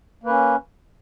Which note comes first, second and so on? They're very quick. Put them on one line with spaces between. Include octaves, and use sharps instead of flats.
A#3 B4 C#4